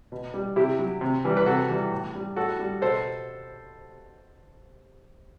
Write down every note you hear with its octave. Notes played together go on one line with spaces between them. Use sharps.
B2
G3
C3 E4 G4
F#3
C3
E3 G3
B4
C3 F#4 A4
E3 G3
A2
G3
A2 F#4 A4
G3
B2 A4 C5